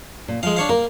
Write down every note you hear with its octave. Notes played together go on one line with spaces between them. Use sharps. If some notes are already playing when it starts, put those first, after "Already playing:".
A#2
F3 G#3 F5
D4 C#5 F5
A#3 A#4